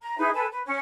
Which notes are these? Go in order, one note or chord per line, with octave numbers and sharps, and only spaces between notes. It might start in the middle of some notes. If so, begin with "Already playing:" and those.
A#5
D#4 E4 G#4 B4
A4 B4 G#5
B4
C#4 C#5